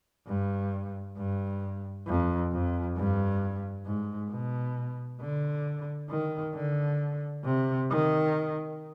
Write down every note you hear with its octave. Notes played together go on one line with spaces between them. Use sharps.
G2
G2
F2
F2
G2
G#2
B2
D3
D#3
D3
C3
D#3